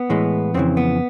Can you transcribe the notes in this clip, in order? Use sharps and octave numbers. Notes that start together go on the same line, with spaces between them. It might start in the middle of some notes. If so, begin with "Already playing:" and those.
Already playing: B3
A2 E3 G#3
F2 C#3 E3 C4
B3